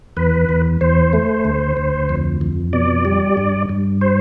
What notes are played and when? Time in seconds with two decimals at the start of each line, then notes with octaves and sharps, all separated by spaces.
0.17 E2 B4
0.49 E2
0.81 E2 C5
1.13 A3
1.45 D2
1.77 D2
2.09 F2
2.41 F2
2.73 B2 D5
3.05 G3
3.37 G2
3.69 G2
4.01 C5